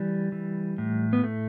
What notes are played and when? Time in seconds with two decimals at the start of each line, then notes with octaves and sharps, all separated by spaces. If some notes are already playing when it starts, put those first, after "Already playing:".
Already playing: E3 G3
0.32 E3
0.78 A2
1.13 B3
1.24 A3